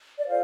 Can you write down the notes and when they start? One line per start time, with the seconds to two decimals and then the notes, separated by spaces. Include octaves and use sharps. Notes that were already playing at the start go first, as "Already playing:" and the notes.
0.19 D5
0.27 F4 A4 C5 F5